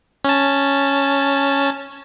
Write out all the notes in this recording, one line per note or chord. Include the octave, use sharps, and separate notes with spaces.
C#4 A5